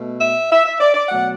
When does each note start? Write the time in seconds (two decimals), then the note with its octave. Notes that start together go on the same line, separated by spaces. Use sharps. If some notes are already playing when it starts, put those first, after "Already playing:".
Already playing: B2 A3
0.21 E5
0.51 E5
0.65 E5
0.80 D5
0.95 D5
1.09 B2 F#3 A3 F#5